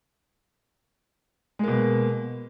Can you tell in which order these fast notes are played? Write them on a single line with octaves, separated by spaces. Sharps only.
G#3 A#3 B2